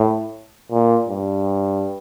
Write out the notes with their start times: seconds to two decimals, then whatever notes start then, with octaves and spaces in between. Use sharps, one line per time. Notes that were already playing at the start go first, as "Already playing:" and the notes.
Already playing: A2
0.72 A#2
1.09 G2